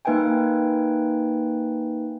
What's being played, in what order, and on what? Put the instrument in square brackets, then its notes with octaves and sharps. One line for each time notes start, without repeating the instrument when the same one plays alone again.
[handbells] A#3 D#4 B4 E5 G5 G#5